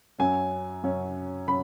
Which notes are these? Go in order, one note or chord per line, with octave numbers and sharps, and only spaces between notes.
F#2 F#3 C#4 G#5
F#2 F#3 C#4
F#3 C#4 B5